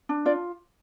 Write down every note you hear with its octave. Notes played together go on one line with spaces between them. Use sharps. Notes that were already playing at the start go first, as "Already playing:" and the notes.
D4
F4 D5